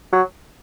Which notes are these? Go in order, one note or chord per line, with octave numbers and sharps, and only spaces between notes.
F#3